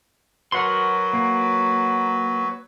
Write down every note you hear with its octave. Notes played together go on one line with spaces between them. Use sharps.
F#3 F#4 A#4 B4 F#5 C6
A#3